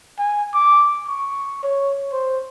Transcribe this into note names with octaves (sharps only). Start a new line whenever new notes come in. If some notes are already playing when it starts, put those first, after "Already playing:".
G#5
D6
C#6
C#5
C5